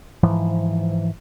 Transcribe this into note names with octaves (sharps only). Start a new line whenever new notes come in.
G#2 E3 F3